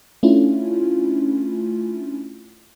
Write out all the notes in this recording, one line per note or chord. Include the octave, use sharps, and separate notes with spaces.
A3 C#4 D4 E4 F4